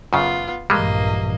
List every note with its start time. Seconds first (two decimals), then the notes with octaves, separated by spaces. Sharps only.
0.13 F#2 C#3 B3 F4
0.70 A#1 G2 E3 G3 G#3 A#3 D#5